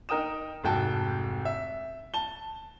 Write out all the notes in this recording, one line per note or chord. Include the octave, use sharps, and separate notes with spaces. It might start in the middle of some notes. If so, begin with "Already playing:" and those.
D#4 A#4 G5 D#6 E7
F1 G#2 F#4 G5 A5
E5
A5 G7